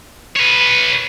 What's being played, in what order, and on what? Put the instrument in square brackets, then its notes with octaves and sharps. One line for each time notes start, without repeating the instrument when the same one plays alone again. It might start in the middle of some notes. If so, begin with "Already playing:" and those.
[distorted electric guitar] B4 C#5